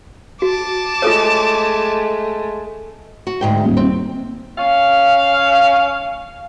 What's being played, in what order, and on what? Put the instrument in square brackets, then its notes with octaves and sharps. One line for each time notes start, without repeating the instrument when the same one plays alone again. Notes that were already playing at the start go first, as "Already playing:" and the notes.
[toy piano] F#4 [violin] A5 D6
[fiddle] G#3 A3 [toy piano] F4 A4 C#5
[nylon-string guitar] F#4
D2 G#2 G5
[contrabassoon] D#1
[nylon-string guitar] C4
[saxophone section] C#4 F5